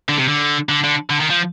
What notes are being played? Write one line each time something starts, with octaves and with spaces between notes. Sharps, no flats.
D3
C3
D3
D3
D3
D3
D#3
F3